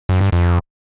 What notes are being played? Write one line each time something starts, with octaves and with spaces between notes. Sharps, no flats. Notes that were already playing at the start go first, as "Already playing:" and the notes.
F#2
G2
F2